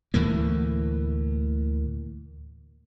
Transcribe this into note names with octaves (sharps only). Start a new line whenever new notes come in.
D2 A2 E3 A#3